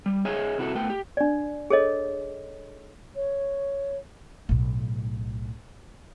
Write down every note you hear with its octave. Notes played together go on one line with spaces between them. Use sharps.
G3
G#4 C#5 D#5 E5 G#5 A#5
C3 E4 F#4 G#4 A4
A3 B3 G5
G4
D4 D5
G#4 A4 C#5 D#5
C#5
B1 A2